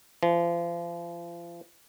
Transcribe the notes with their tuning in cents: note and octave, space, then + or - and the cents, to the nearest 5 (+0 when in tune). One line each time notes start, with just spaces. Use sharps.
F3 -35